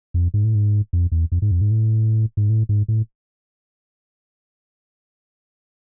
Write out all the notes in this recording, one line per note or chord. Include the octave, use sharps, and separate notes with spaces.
F2
G#2
A2
G#2
F2
E2
F2
G#2
F2
G#2
A2
G#2
A2
G#2
A2